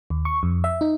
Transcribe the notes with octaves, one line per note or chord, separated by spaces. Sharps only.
D#2
C#6
F2
E5
D#4